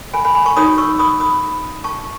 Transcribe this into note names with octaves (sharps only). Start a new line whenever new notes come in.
G#5 B5
G#5 B5
G#5 B5
A5 C#6
D#4 F#4 C#5 B5 D#6
C#6 E6
B5 D#6
B5 D#6
A5 C#6